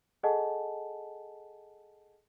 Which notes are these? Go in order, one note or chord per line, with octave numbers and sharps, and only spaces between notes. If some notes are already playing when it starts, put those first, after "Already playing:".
G#4 A4 D#5 F#5 G#5 A5